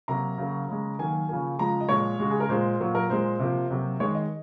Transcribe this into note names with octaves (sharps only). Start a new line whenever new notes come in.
C3 F#3 A#3 A#5
C#3 F#3 A#3
C#3 G#3
D#3 F#3 A#3 G#5
C#3 F3 A#3 G#5
C#3 F3 G#3 A#5
D#5
A#2 F3 G#3 C#5
C#3 G#3 F#4
G#4
A#4
A#2 G#3 C5
A#2 F#3 A#3
A#4
A#2 G#3 C5
C3 F3 A#3
C3 F#3 A#3
D#3 G#3 C#5
D#5